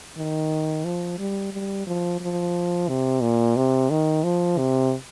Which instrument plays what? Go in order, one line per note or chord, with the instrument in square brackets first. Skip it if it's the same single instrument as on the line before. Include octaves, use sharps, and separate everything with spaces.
[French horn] D#3
F3
G3
G3
F3
F3
C3
A#2
C3
D#3
F3
C3